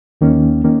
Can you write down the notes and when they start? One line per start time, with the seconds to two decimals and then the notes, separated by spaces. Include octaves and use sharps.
0.21 D#2 D#3 A#3 C#4
0.64 D#3 A#3 C#4